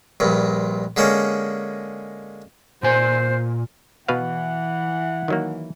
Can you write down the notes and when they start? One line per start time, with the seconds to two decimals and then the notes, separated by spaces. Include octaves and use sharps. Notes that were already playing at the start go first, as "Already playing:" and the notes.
0.20 A#1 G2 A#2
0.97 D3 G#3 A#3 C#4
2.83 A#2 C5 G#5
4.08 B2 E3 B4 F5 F#5
5.28 D#3 F#3 A#3